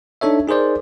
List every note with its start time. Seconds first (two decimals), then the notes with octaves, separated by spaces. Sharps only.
0.21 D4 D#4 A4 C#5 E5
0.48 D#4 G#4 A#4 C5 D5